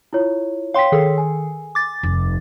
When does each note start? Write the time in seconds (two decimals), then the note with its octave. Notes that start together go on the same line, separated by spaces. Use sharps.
0.13 E4 F4 C#5
0.74 C#5 F5 G5 C6 B6
0.92 D#3 G#4 A4
1.18 G#5
1.75 D6 A6
2.03 F1 D#2